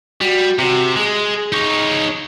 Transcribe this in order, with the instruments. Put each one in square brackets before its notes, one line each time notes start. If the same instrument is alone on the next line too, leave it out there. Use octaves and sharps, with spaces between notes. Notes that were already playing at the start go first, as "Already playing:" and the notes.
[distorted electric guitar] G3 [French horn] F#4
[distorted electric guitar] C3 [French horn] F#4
[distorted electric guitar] G#3 [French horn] G#4
[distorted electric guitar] D#4 C#5